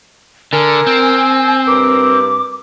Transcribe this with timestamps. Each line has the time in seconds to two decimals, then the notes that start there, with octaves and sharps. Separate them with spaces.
0.53 D3 A#4 G#5
0.86 C4
1.67 G2 A#4 B4 D6